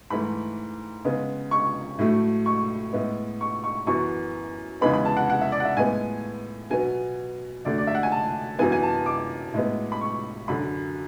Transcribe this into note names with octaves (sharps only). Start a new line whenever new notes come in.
G#2 E3 A3 B5
C#3 G#3 B3
C#6
A2 F#3 A3
C#6
A2 G#3 B3
C#6
C#6
F#2 E3 B3 C#6
E2 C#3 E3 G#3 B3 B5
B5
A5
F#5
F#5
E5
D5
F#5
E5
A2 G#3 B3 G#5
B2 F#3 B3 G#5
F#2 D3 A3 D5
D5
E5
F#5
G#5
A5
F#2 E3 B3 G#5
G#5
A5
D6
A2 G#3 B3
B5
C#6
F#2 D3 F#3 B5